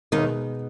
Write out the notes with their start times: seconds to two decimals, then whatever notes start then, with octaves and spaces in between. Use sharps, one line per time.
0.12 D#2 B2 D#3 G#3 B3 D#4